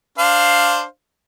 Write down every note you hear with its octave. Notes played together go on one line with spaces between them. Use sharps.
D4 C5 F5